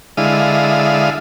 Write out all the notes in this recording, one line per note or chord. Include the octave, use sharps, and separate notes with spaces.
D3 G#3 E4 F5 D#6